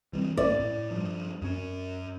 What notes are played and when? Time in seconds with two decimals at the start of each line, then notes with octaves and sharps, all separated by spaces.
0.13 E3 G3 C4
0.37 A#1 C#4 D5
0.59 A2
0.90 G2 F3 G3
1.42 F#2 C#4